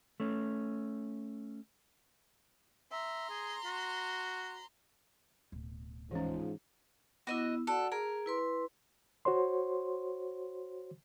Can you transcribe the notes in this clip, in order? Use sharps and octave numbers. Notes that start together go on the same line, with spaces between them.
A3 C#4
E5 A#5 C6
G#4
F#4
D1 B2
G#2 E3 F3 C#4
B3 E4 F#4 D#5
F#4 A4 D5 F#5
G#4 A#4
E4 B4 C6
F#4 C5 C#5 C6